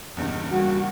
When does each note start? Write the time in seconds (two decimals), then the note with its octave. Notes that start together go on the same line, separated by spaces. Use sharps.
0.17 E2 G2 A#2 C#3 B3 D#4
0.52 G3 A3 A#3 F#4